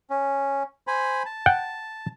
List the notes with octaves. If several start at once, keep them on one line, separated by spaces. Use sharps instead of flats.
C#4
C5 G#5 B5
A5
F#5 G5